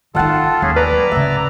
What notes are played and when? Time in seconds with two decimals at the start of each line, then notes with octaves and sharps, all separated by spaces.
0.15 D#3 D#4 F4 A4 F#5 G5 A5
0.62 D#2 C#4 G#4
0.76 B4 D5 A#5
0.91 F#3
1.12 C#2 C#3 E5